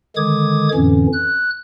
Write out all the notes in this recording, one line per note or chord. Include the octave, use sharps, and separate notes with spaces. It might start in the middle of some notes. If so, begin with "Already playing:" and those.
D3 D#3 G#3 D6 D#6 G#6
F2 A2 D3 E3 C#4
F#6